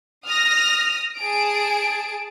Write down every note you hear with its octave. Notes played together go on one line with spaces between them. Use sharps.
D#6 F6 A#6
G#4 A5 D7